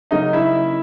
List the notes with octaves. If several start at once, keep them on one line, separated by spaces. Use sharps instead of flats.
C#3 F#3 A#3 C#4 D#4 D#5
E4 E5